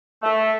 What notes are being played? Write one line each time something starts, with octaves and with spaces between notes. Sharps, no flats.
A3